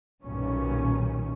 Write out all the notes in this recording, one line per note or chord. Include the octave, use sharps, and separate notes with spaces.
B1 G2 A#2 D#3 C#4